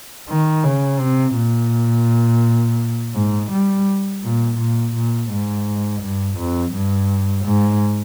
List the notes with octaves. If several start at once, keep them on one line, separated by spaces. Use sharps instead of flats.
D#3
C#3
C3
A#2
G#2
G3
A#2
A#2
A#2
G#2
G2
F2
G2
G#2